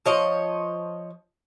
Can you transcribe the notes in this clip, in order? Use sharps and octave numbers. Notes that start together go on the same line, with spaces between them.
F3 C#5 D#5